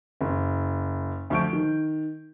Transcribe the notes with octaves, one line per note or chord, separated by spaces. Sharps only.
F#1
D2 F3 C#6 G6 D7
D#3